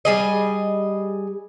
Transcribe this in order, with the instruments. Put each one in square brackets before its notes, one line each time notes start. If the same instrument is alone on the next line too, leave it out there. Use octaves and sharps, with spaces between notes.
[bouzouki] G3 G#4 D#5